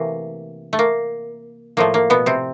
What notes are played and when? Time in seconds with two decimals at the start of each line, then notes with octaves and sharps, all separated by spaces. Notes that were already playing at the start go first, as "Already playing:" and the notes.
Already playing: C3 E3 A3 A#3
0.73 A3
0.79 A#3
1.77 A2 F3 A3 A#3
1.94 A#3
2.10 B2 B3
2.26 C3 C4